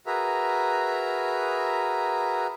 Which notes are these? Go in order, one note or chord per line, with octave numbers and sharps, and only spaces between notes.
F#4 G#4 A#4 B4 E5 A#5